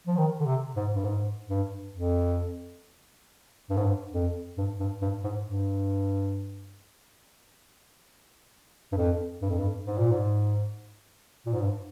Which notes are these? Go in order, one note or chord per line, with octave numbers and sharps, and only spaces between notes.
F3
D#3
D3
C3
G#2
G2
G#2
G2
F2
G2
G#2
G2
F2
G2
G2
G2
G#2
G2
G2
F2
G2
F2
G2
G#2
A#2
G#2
A#2
G#2
G2